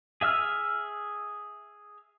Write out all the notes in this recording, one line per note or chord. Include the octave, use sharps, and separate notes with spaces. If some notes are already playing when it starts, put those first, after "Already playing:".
G#4 E5 E6 F6